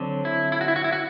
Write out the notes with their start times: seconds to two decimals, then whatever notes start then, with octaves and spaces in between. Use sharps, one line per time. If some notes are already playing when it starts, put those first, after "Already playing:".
Already playing: D3 F#3 C4
0.25 E4
0.52 E4
0.61 F#4
0.68 E4
0.76 F#4
0.84 E4
0.93 F#4